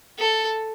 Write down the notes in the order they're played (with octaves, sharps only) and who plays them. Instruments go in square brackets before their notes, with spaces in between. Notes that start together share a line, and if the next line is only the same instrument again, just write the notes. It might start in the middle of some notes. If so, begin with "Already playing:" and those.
[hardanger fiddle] A4